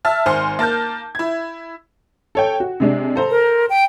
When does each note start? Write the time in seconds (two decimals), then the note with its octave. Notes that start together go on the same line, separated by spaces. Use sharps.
0.05 E5 A5 F6
0.26 G#1 C5 G#5 C6 F6
0.59 A#3 A5 F6 G6
1.15 E4 G#6
2.35 A4 C#5 G5
2.60 F#4
2.80 C3 G#3 D4
3.16 A4 C5 A#5
3.30 A#4
3.70 G5